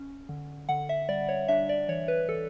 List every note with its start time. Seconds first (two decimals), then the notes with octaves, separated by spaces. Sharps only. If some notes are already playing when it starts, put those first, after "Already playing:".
Already playing: C#4
0.29 D3
0.69 D3 F#5
0.89 E5
1.09 G3 D5
1.29 C#5
1.48 D4 E5
1.69 D5
1.88 E3 C#5
2.08 B4
2.28 E3 A4